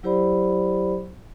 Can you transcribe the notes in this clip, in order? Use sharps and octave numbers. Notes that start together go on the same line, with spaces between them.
F#3 E4 G4 C5 D5 B5